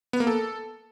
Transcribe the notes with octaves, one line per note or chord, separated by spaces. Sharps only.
B3
A#3
A4